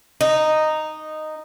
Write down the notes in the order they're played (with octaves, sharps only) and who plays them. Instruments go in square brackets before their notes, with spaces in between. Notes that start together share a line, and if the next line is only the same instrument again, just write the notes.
[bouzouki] D#4